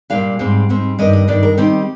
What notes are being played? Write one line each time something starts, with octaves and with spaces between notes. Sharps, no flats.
A#2 G3 D4 F5
G#2 G3 C4
G#2 G3 C4
G2 D#3 G3 D4 D#5
D#5
G2 D#3 G3 D4 D5
A#4
D#3 G3 C4 D#4 G4